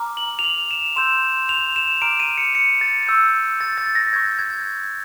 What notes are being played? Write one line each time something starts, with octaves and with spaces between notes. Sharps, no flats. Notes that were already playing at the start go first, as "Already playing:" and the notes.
Already playing: A#5 D6 F6
F#7
F7
F#7
E7
C6 E6 G6 E7
F7
E7
A#5 D6 F6 D7
D#7
C#7
C#7
A6
C#6 E6 G6
A6
A6
A#6
C#6 E6 G6 G#6
G#6